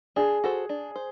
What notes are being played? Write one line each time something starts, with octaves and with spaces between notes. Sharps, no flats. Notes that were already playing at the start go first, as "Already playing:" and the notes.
D4 G#4
F#4 A4 C5
D4
C5